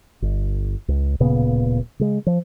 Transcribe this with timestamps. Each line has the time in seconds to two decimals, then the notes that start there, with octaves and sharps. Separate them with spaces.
0.22 G1
0.88 C#2
1.20 D1 A#2 C#3 B3
1.99 C#3 G#3
2.27 F3